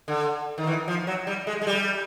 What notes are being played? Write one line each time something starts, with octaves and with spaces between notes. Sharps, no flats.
D3
D#3
E3
F3
F#3
G3
G#3
G#3
G3